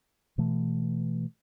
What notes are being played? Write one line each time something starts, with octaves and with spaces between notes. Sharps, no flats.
B2 E3 A3